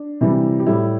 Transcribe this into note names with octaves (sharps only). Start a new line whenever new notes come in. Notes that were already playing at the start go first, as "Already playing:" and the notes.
Already playing: D4
C3 E3 G3
G4
A2 G3 E4